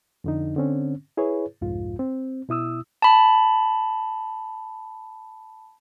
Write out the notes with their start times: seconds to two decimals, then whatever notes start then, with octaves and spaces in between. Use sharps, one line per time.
0.24 F2 D3 D#4
0.56 D3 C4 C#4
1.17 E4 G#4 B4 C#5
1.61 C2 F2 G#2 F4
1.99 C4
2.49 B2 E4 D#6 E6
3.02 A5 B5